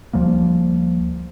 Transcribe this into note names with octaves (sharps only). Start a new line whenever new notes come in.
D2 F3 G3 A#3